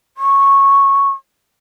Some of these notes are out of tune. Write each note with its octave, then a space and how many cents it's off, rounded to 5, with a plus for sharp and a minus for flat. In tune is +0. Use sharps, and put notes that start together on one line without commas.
C#6 -10